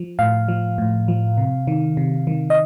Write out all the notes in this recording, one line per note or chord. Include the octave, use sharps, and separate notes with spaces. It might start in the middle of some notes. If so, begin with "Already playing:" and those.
Already playing: F3
A2 F5
F3
A2
F3
C3
D#3
C3
D#3
D#5